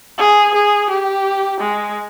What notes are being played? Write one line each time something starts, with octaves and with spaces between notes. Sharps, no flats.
G#4
G#4
G4
G#3